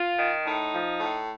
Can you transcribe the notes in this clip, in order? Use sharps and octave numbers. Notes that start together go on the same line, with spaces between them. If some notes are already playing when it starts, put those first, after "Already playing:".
Already playing: F4
D#3
A2 D#4
F3
A2